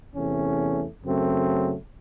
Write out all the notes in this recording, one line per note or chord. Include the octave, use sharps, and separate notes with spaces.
E2 C3 E3 A3 C#4
F#2 C#3 F#3 A3 C4